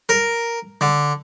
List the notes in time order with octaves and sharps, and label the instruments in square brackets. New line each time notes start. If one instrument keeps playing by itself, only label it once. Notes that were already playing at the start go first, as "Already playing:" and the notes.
[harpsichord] A#4
D3